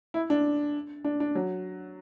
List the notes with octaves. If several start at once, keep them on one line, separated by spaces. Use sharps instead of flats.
E4
D4
D4
D4
F#3